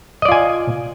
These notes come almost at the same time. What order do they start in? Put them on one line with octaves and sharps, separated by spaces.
D#5 D5 F4 G#5